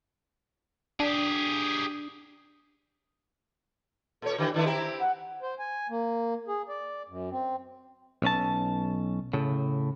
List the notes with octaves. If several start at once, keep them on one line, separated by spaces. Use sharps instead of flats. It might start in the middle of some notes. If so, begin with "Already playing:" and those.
D4 G4 G#4
A#2 A4 C#5
D3 E3 G4
D3 D#3 A3 E4
C4 E4 G4 A#5
F#5
C5
G#5
A#3
G#4
D5
F#2
C4
B1 C#4 A5
A2 C#3